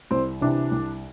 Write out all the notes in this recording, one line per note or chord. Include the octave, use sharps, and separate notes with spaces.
C2 C4
C3 E3 D4
C2